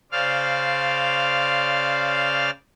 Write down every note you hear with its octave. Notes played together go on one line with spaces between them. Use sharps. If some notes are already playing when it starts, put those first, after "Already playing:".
C#3 C5 D5 F5 F6